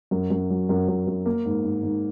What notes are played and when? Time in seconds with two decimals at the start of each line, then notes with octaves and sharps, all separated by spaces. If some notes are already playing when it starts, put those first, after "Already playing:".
0.11 F#2
0.30 F#2
0.50 F#3
0.69 F#2
0.88 F#2
1.07 F#2
1.26 A#3
1.45 G#2
1.64 G#2
1.83 G#2